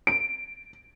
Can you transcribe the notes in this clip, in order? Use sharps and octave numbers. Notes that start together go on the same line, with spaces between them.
D7